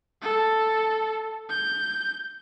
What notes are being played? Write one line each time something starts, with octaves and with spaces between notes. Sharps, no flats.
A4
G6